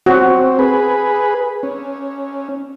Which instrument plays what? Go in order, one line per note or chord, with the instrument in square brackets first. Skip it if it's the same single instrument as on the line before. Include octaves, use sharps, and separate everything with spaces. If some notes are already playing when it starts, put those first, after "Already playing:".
[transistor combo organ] C4 [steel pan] F#4
[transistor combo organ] G#4 B4
C#4